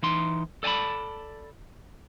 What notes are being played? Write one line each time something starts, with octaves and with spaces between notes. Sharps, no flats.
E3 D#4 C6
A4 D5 G#5 A5 B5